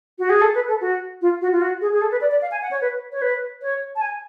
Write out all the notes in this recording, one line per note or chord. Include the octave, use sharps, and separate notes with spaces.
F#4
G#4
A4
B4
A4
F#4
F4
F#4
F4
F#4
G#4
G#4
A4
B4
D5
D5
F5
G#5
F#5
C#5
B4
C#5
B4
C#5
A5
G#5